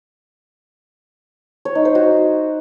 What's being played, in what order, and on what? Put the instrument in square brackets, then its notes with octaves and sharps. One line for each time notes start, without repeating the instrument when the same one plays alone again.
[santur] C#5
D#4
C5
F#4